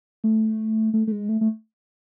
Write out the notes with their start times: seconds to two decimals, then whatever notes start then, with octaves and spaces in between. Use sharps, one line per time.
0.24 A3
0.94 A3
1.07 A3
1.12 G#3
1.29 A3
1.41 A3